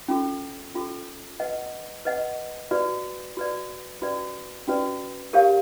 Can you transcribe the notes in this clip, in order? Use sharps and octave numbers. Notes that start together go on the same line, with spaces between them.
C#4 F4 A4
C#4 F4 A4
B4 D#5 F#5
B4 D#5 F#5
F#4 B4 D5
F#4 B4 D5
C#4 F#4 B4 D5
C#4 F#4 B4 D5
G4 A#4 C#5 F5